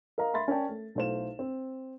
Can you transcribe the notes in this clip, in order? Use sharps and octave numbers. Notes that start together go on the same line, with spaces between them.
A#4 D#5 F5 A#5
E5 B5 C6 A6
C#4 A#4 C#5 D5 G5 A5
A3
B1 A3 E4 C5 F5 E7
C4